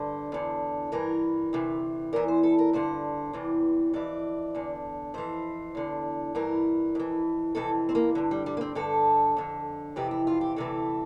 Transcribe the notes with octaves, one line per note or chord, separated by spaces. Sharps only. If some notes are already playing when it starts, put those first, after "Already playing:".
Already playing: G2 D3 C5
E2 D3
G2 E3 A#4
D2 C3 E3
E2 E3 A#4
C5
A4
A#4
G2 D3 C5
E2 C3 E3
F2 E3 D5
E2 D3
F2 E3 C5
E2 D3
G2 E3 A#4
F2 E3
F2 C3 E3 A4
C4
A#3
G2 D3
G3
G3
A#3
C4
G2 D3 A4
F2 D3
F2 C3 E3 G4
E4
F4
G4
D2 C3 E3 A4